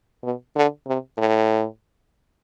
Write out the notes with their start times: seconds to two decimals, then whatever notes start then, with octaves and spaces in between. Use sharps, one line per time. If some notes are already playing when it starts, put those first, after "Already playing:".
0.23 B2
0.56 D3
0.87 C3
1.18 A2